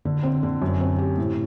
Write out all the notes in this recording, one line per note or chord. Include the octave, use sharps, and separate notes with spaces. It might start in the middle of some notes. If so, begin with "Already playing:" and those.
D3
C4
D3
F#2
C4
G4
A2